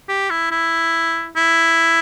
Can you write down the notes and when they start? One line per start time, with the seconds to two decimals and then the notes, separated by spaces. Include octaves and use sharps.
0.09 G4
0.30 E4
0.51 E4
1.36 E4